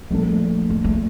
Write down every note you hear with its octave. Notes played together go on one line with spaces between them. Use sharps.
A#1 A#2 G3 A3
A3
A3